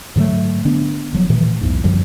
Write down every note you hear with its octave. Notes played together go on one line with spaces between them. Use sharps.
G#2 D3 F#3 A3
D3 B3 D4
D#1 F3 F#3
A#2 D#3 E3 A3
B1 E2 G#2
F#2 D3 F3 G3